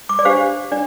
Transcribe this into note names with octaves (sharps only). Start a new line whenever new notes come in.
D6
D5
D4 G4 C5 F5
D4 D5